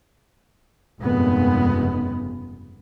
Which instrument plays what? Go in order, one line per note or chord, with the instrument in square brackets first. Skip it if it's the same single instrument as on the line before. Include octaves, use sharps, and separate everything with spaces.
[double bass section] F1 G2 A#2 C#3 G#3 B3